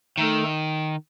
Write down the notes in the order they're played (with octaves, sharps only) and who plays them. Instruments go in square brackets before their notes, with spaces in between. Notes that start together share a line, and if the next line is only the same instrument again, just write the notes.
[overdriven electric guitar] D#3 [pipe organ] A3 D#4 A4